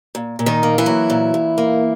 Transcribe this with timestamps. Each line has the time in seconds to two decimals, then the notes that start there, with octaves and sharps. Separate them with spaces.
0.15 A#2
0.39 A#2
0.46 D#3 D#4
0.63 A#3
0.78 E3 E4
0.86 F#3
1.10 A#2
1.34 A#2
1.58 A#3